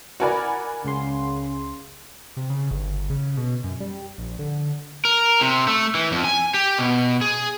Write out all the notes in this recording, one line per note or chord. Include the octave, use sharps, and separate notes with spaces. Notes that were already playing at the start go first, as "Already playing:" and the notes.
F#4 A#4 D5 F#5 G#5 B5
C#2 C#3 C6
C3
C#3
G1
C#3
B2
F#2
G3
A#1
D3
A#4
C3
A3
E3
F2
G#5
G4
B2
G#4